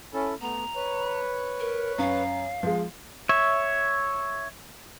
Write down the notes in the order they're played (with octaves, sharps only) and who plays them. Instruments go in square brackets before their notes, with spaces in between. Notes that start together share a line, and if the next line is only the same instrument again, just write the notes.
[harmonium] C#4 E4 A4
[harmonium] A3 B3 [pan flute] A#5
[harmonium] B4 C#5
[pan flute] A#4
[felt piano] F#2 [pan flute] F5
[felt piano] F3 G#3
[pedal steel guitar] C#5 E5